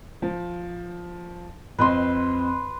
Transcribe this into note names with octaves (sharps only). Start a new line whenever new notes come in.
F3
F2 C4 B4 D#5 C6